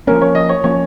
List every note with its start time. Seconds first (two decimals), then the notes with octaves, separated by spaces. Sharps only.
0.07 F3 A#3 C#4 A#4
0.21 C#5
0.35 D#5
0.49 C#5
0.64 F3 A#3 C#4 C#5